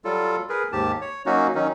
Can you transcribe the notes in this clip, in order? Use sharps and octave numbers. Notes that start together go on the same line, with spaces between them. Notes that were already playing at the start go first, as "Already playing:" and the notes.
F#3 G3 F4 A4
G#4 A#4 B4
D#2 G#2 G4 A5
C#5
F#3 A#3 C#4 D#4 F#4
D#3 F#3 C#4 D#4